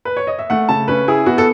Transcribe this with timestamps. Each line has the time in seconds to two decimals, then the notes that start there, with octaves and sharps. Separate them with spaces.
0.05 B4
0.17 C#5
0.27 D#5
0.39 E5
0.50 A3 F#5
0.69 C#3 A5
0.88 C#4 B4
1.08 E4 G#4
1.26 B3 F#4
1.38 A4